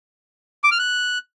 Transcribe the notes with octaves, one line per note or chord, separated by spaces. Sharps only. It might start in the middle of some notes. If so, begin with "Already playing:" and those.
D6
F6
F#6